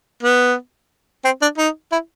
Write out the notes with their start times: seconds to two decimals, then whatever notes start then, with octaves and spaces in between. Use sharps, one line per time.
0.23 B3
1.25 C4
1.42 D4
1.58 D#4
1.92 E4